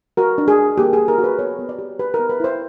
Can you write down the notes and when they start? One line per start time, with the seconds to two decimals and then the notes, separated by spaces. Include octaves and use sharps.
0.17 F#4 A#4
0.38 D4
0.48 G#4
0.58 D4
0.78 A#3 G4
0.93 G#4
0.99 A#3
1.08 A#4
1.18 F#4
1.24 B4
1.39 B3 C#5
1.59 B3
1.69 D5
1.79 G4
1.99 G4 B4
2.14 A#4
2.19 B3
2.29 B4
2.40 E4 C5